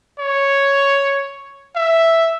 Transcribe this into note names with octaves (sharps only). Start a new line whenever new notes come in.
C#5
E5